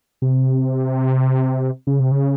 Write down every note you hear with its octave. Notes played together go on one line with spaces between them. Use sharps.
C3
C#3
C3
C#3